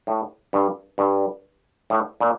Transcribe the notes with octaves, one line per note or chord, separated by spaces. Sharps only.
A2
G2
G2
A2
A#2